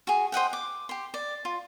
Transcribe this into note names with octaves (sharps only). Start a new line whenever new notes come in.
F#4 G#4
C5 D#5 F#5 G5
D6
G4 C6
D5
F4